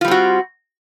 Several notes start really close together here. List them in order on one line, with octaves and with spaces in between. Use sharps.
F4 G3 C4 F#4